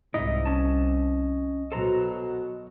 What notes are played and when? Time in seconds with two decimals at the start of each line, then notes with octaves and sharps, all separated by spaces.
0.14 C2 G#2 D#4 E4 D#5
0.46 C#4 A5
1.72 B2 F#3 A4 C5 A#5